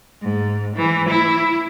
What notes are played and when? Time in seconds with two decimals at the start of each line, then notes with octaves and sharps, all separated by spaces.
0.22 G#2
0.76 E3
1.09 E4